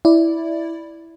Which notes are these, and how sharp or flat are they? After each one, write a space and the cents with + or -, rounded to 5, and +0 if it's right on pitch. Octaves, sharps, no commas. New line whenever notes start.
E4 +0 D5 +0